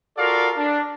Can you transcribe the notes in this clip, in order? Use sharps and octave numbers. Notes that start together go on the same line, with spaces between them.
F4 F#4 A4 A#4 D5 F5
D4